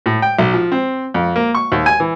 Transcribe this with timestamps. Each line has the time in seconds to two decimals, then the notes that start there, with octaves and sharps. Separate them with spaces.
0.06 A2
0.22 G5
0.39 B1
0.54 F3
0.72 C4
1.14 F2
1.36 A#3
1.55 C#6
1.72 D#2
1.86 G#5
2.00 E3